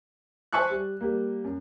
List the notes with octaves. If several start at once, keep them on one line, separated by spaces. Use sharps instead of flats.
C5 E5 G#5 A5 C#6 F#6
G3
G3 A#3
F#2